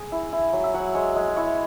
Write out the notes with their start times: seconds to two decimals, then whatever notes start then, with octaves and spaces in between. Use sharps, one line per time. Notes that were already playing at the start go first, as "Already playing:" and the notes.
Already playing: G#4
0.12 E4
0.32 E4
0.53 F#3
0.64 E5
0.74 F#3 F#5
0.95 G#3 C#5
1.16 G#3
1.36 E4 C#5